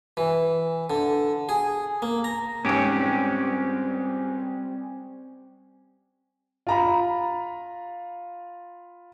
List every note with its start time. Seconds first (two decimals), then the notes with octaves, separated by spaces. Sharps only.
0.17 E3
0.90 D3
1.49 G#4
2.02 A#3
2.24 A#5
2.65 C#2 G#2 G3 C4 C#4 G4
6.67 F4 A#5 B5